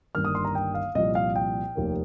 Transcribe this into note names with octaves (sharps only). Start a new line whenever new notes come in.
G1 G2 D#3 A#3 F6
D#6
C6
A#5
G5
F5
C2 A#2 F3 D#5
F5
G5
F1 D#2 D#3 A#3